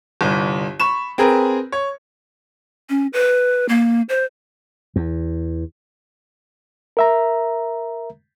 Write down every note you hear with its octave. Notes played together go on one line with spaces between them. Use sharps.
G1 C2
B5 C#6 E7
C4 G#4 A#4 B4
C#5
C#4
B4
A#3
C5
E2
A#4 E5 A#5